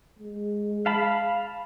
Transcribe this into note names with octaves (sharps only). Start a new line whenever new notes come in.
G#3
F5 A5 B5